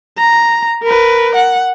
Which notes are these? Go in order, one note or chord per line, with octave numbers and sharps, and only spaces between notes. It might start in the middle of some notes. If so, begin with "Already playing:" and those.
A#5
A#4 B4
F#5